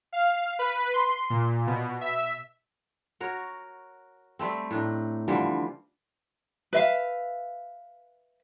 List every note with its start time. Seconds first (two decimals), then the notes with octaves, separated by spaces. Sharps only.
0.13 F5
0.59 B4
0.93 C6
1.30 A#2
1.67 B2
2.01 E5
3.20 F#4 A#4 C#5
4.39 G3 A3 C4
4.71 A2 D4 D#4
5.28 D3 E3 F3 G3
6.73 B4 E5 F5